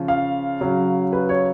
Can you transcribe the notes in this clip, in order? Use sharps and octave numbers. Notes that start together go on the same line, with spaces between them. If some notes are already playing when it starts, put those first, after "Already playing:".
Already playing: C#3 F3
F5
C#3 F#3
B4
C#5